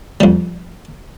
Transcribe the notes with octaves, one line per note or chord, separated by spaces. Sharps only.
F2 G3